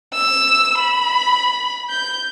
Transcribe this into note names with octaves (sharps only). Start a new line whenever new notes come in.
E6
B5
G6